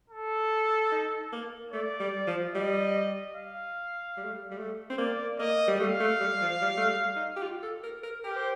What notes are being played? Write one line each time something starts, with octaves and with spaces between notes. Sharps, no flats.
A4
D#4
A#3
A3 D5
G3
F3
G3 D#5
F5
G3
A3
G3
G3
A3
C4
A#3 D5
A#3 D#5
G3
A3 F5
A3
G3
F3
G3
A3
G3
D#4
G4
F4
A4
A#4
A#4
G4 A#4
C5